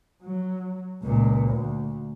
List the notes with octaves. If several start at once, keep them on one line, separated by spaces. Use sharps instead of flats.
F#3
C#2 A#2
D2